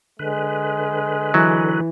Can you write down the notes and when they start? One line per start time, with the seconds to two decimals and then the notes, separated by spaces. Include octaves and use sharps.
0.19 D3 G#3 B4
1.34 E3 F#3